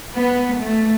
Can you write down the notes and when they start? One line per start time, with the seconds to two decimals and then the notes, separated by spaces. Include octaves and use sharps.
0.15 B3
0.59 A3